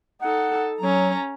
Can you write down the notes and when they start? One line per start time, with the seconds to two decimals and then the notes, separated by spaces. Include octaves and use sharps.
0.22 D#4 A4 F#5
0.81 F#3 C#4 A#5